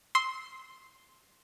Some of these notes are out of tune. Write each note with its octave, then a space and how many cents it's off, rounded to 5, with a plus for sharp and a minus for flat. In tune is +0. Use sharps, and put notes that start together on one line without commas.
C6 +0 E6 -30